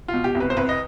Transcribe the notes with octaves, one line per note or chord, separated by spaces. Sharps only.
F4
B2
G4
C2
B4
C5
C2 B4
D#5